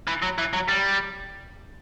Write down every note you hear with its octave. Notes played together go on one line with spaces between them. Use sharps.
E3
F#3
E3
F#3
G3